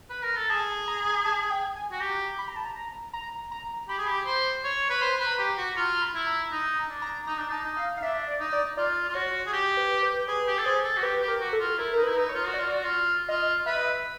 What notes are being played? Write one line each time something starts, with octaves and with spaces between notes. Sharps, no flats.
B4
A#4
A4
G#4 A5
A#5
A5
G5
G#5
F#4
G4 A#5
B5
A#5
A5
A#5
A#5
A#5
A#5
G4 B5
G#4
G4
C5
C#5
B4
C5 B5
B4
A#5
G4
F#4
F4 A#5
B5
E4
A#5
D#4 A#5
A#5
D4
A#5
D#4 A#5
D4
D#4 A5
D#4
F5
F5
D4 E5
D5
D#4
D5
F4 D5
F4
F#4 C#5
G#4
G4
B4
B4
G#4 B4
G4
A4
G#4 C5
A4
F#4
G4 B4
G4
A#4
F#4
A4
F4
E4 A#4
D#4 A#4
B4
E4
D#4
C#5
F4
F#4
D5
F4
F#4
F4
F4 D#5
B4 E5
D#5
E5